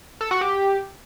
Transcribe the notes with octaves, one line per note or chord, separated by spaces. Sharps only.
A4
F#4
G4